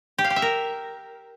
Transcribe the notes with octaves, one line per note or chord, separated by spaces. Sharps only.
G4
F5
G4
E5
A#4